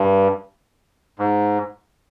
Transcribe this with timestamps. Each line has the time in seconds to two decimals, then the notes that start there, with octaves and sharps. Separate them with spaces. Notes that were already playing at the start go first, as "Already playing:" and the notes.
Already playing: G2
1.19 G#2